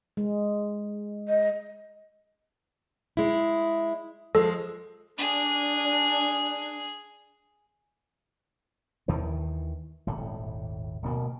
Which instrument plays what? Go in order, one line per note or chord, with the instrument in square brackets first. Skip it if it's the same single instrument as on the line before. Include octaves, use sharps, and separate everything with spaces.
[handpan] G#3
[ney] D#5
[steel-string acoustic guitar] G#3 E4
[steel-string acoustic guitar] F3 G#3 [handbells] A4
[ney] D4 [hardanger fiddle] G#4
[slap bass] D#2 D#3 E3
D#1 G#1 A2
D1 B2 A#3